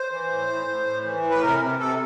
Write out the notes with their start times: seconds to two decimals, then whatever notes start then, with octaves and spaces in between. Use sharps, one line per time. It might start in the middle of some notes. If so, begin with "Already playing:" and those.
Already playing: C5
0.12 E3
0.30 A2
0.48 A2
0.67 A2
0.86 A2
1.04 E3
1.23 A2
1.30 B4
1.42 C3 A#4
1.61 C3
1.79 C3 A4